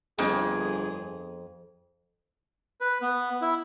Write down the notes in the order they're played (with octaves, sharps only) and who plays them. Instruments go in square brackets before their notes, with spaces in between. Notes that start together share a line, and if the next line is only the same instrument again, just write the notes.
[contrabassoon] G1 [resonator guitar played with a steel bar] F2 [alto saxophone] G#4
[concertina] B4
B3
E4